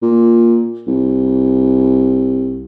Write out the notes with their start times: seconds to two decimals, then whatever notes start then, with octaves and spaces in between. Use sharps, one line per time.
0.02 A#2
0.87 C2